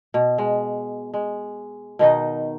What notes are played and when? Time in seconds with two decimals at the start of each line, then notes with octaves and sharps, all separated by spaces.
0.14 B2
0.38 G#3
1.14 G#3
1.99 B2 D#3 D#4 D#5